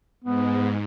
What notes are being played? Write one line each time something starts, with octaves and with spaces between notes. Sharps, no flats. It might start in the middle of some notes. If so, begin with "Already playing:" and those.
G#2 B3